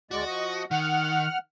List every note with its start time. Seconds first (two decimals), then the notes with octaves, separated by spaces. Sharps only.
0.11 D2 G#3 F#4 D5
0.26 F3 D#5 C#6
0.71 D#3 F#5 F6